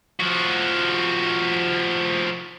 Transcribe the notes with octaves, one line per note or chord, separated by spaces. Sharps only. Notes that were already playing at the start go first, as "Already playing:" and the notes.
F3 F#4